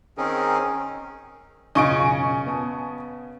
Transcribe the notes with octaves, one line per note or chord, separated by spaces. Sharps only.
D#3 C4 C#4 D#4 G#4 A#4
E1 F#2 C#3 F4 D#5 G#5 C#6 D7
B3 A5 D#6